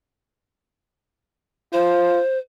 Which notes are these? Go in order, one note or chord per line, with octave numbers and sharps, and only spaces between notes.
F4 C5